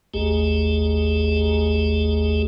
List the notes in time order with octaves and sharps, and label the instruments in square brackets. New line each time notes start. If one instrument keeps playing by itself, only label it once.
[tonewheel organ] G#1 D#2 A3 G4 G#4